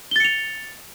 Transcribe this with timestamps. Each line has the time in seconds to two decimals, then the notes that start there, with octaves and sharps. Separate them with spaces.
0.11 G7
0.16 A6
0.20 C#7
0.25 F7